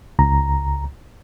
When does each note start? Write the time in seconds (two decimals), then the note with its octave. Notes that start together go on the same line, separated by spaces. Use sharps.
0.19 C#2 A#5